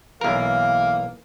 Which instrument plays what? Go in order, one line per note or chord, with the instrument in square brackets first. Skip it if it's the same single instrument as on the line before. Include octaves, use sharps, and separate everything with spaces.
[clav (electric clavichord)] B1 A#4 [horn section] E3 A#3